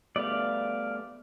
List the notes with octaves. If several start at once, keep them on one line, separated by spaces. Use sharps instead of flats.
G3 A3 B3 D5 F5